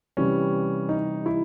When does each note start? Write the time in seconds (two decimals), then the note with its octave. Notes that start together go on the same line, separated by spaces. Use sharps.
0.17 C3 E3 G3 C#4
0.89 D#4
1.26 E4